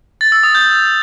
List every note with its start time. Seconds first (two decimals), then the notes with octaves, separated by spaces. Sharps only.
0.21 A6
0.32 E6
0.43 D#6
0.55 G6